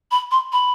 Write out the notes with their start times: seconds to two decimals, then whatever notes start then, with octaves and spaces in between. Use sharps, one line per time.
0.11 B5
0.31 C6
0.53 B5